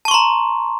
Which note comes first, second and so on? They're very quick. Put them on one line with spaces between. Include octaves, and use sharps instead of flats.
A5 C#6 C6 A#5